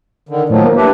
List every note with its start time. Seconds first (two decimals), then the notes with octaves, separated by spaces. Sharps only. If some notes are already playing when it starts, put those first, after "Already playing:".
0.29 D3 D#3
0.49 A2 D#3 F3 F#3
0.63 A#3
0.77 D4 E4 G4 B4